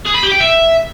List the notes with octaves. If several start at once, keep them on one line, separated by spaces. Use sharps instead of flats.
G#4
B5
G4
G5
E5